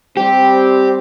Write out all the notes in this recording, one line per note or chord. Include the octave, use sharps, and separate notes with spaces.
G3 C4 G4